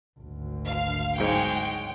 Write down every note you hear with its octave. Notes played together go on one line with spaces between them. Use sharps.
G#1 D2
F5
B1 G#2 G#3 C#5 G5